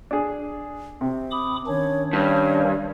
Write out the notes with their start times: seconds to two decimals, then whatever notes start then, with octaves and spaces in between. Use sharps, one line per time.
0.11 D4 G#4
1.01 C3 C4
1.31 B5 D6 D#6
1.67 D#3 C#4 D4 C#5
2.13 G2 C#5